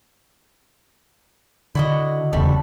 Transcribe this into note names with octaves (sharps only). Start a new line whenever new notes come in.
D3 E4 F#4 D#5
D1 E2 C#3 G3 A3 F#4